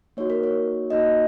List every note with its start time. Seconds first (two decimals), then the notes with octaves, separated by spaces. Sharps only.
0.17 A#3 D#4 F#4 C#5
0.30 A#4
0.43 C#5
0.90 A#3 D#4 F#4 D#5